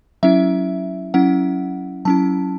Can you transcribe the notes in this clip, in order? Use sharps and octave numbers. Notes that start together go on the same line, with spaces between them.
F#3 C#4 E4 E5
F#3 C#4 E4 F#5
F#3 C#4 E4 A5